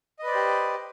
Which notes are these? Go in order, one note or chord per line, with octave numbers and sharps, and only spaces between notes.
G4 B4 C5 D5 D#5